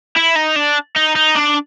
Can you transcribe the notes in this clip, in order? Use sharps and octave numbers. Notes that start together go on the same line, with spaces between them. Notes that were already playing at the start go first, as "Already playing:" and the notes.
E4
D#4
D4
D#4
D#4
D4